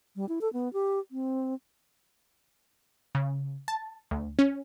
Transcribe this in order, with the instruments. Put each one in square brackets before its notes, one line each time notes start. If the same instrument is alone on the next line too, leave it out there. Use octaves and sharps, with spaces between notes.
[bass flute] G3
E4
A4
B3
G4
C4
[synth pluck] C#3
A5
D2
C#4